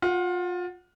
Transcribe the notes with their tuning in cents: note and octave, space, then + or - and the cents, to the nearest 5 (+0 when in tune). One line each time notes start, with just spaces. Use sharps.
F4 +25 F#5 +0